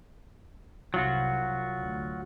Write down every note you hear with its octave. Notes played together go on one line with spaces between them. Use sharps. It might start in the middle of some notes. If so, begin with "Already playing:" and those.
C2 F#3 F4 F#4
D2